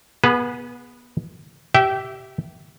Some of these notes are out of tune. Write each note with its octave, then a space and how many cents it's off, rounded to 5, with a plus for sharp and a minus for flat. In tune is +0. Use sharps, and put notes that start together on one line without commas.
B3 -25 G#4 +0 B4 +5
G4 -20 E5 +0 G5 -25